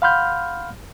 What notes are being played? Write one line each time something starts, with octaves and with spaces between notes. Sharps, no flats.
F5 F#5 B5 C6 F6 G6